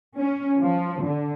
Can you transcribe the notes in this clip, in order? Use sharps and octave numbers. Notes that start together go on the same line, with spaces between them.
C#4
F3
D3